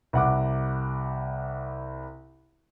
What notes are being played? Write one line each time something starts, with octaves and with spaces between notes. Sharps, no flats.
C2 F#5 D6